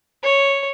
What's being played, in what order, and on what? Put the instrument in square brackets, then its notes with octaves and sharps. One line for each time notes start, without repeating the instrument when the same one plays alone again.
[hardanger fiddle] C#5